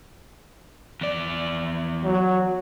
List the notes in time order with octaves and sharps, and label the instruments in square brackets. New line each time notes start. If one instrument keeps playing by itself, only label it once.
[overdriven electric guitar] E2 D5
[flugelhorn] F#3